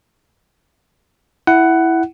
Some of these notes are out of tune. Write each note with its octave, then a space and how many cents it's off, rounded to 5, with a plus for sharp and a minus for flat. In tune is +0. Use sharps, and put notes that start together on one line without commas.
E4 +0 F#5 +10